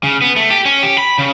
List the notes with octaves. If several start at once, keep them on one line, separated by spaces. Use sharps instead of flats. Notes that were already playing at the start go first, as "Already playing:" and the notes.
C#3
B3
A3
G4
C#4
G4
B5
C#3